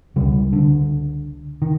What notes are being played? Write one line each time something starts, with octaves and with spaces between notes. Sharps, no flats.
C#2 C#3 G3
D3
D#3